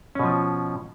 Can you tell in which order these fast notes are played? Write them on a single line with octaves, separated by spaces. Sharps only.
C#4 B2 F3